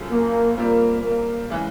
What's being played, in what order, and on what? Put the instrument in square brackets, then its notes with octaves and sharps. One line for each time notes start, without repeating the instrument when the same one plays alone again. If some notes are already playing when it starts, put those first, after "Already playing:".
Already playing: [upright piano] F#2 C#3 F3 A3
[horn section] A#3
[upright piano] A#2 G3 C4 F4 A#4 [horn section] A#3
[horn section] A#3
[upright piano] C#3 E3 G#3